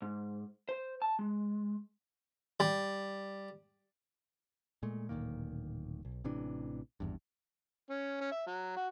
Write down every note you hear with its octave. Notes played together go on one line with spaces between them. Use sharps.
G#2
C5
A5
G#3
G3
A#2 G#3 A3
D1 A#2 D#3 A#3
B1
A1 C3 E3 D4
G#1 E2 G2
C#4
C#4
E5
F#3
F#4